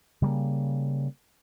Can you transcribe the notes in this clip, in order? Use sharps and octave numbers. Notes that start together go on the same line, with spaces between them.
C#3 G3 A3 A#3